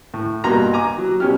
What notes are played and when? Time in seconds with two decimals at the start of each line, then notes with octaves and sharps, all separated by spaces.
0.14 A2
0.44 G2 B2 A#3 F#4 A#5 C6
0.73 G#5 A#5 D6
0.98 F#3
1.20 B2 G3 C#4 G4 F6